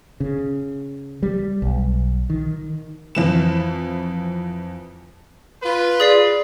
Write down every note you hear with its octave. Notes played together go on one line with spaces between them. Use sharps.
C#3
G3
B1
D#3
F2 E3 E7
F4 B4
G#4 D5 C7